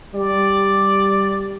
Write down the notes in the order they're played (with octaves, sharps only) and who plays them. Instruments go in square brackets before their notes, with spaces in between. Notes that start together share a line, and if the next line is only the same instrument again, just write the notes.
[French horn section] G3 [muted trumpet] D5